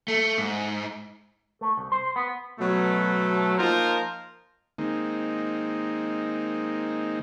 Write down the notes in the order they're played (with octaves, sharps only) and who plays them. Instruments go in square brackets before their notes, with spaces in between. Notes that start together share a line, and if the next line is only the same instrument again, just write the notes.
[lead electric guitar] A3
G#2
[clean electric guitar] A3
C2
C5
B3
[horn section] B2 F#3 A3
F3 A#3 D#4 F4 A#4 C5
[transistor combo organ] D#3 G#3 A#3 C4 D#4